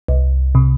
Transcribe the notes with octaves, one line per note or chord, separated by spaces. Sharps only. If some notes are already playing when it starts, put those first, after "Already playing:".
C2
C3